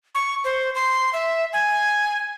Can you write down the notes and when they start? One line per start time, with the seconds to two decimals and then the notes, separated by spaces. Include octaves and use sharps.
0.15 C#6
0.44 C5
0.75 C6
1.13 E5
1.53 G#5